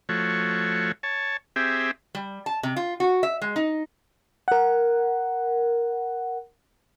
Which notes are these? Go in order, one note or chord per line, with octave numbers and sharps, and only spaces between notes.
F3 A3 F#4 C#5
C#5 A5
C4 G4 G#4 E5
G3
A5
C3
F4
F#4
E5
G#3
D#4
A#4 F#5